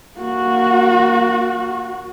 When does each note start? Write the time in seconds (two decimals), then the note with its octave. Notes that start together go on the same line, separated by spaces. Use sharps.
0.19 A#3 F#4